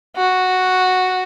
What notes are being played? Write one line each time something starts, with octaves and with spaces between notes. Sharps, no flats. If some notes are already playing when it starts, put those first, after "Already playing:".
F#4